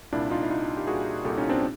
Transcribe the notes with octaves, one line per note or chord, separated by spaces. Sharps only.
C2 A#2 D4 E4
D#4 F4
E4
C2 A#2 D#4 F4
G4
C2 A#2 F#4 G#4
C2 A#2 G4 A4
C#4 D#4
C4 D4